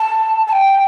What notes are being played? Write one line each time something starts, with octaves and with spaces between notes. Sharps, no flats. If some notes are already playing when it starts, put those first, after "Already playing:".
Already playing: A5
A5
G5